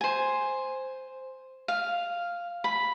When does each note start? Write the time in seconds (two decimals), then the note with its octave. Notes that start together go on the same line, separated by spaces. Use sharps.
0.01 C5 G#5
1.68 F5
2.64 B5